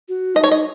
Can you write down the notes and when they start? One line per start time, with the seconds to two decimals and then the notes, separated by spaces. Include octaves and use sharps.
0.09 F#4
0.35 D#4 D#5
0.44 C#5
0.51 D#5